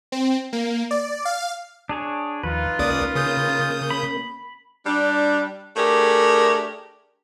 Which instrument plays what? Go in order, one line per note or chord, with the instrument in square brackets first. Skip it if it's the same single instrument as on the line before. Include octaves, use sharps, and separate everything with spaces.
[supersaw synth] C4
A#3
D5
F5
[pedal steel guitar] D4 G#4 C#5
[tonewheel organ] D#2 D#3 F3 [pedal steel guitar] D#4 B4 [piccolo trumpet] F4
[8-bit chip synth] C#2 D5 D#6 [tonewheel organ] A#3 C#4 A#4
[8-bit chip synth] C#3 D#6 G6
[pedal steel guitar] B5
[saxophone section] G3 D4
A3 D4 G4 G#4 A#4